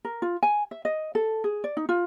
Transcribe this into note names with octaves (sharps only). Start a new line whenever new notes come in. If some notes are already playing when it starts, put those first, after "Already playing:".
A#4
F4
G#5
E5
D#5
A4
G#4
D5
D#4
F4